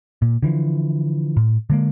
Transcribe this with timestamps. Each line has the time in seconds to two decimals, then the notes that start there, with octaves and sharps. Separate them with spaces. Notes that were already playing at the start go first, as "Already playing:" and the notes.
0.22 A#2
0.43 D3 E3 F3
1.37 A2
1.70 D3 G#3 A#3